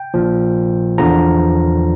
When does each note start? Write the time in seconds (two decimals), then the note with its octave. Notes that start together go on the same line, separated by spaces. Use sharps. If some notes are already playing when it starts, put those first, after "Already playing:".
Already playing: G5
0.14 A#1 A#2 F3
0.98 E2 D3 F3 A#5